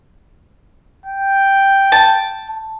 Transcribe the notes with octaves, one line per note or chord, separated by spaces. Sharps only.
G5
A5